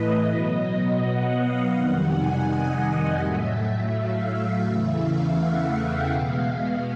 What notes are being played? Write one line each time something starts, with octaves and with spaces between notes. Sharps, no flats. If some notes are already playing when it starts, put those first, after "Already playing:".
Already playing: A2 E3 A3 B4 D#5
B2 F#3 B3
F#5
F5
F2 C3 D#3 G3 F#5
G#5
D#5
A2 F#3 A3 E5
F5
E5
E2 C#3 E3 A3 E5
F5
F#5
G5
B2 G#3 B3 F5